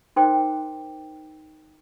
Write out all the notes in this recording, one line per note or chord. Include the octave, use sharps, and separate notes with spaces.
D#4 A#4 C5 G5 C6 D6